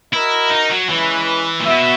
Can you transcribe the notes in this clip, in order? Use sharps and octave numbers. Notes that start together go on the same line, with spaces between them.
E4 F#4 A#4 D#5
D#4
F#3
E3 G#3 C#4 E4 B4
A#2
B2 F#4 E5